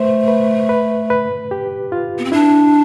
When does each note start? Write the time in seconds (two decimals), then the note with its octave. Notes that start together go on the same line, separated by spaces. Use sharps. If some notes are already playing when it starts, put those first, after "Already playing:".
Already playing: A3 B4 C5
0.28 B4
0.69 B4
1.10 B4
1.51 G4
1.92 F4
2.18 B3
2.25 C4
2.32 D4 E4